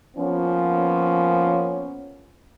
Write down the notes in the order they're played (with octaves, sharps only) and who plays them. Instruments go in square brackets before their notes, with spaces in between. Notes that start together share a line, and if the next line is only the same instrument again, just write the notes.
[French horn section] F3 A#3 B3 C#4